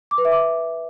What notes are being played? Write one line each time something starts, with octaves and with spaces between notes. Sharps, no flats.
D6
B4
E5
D6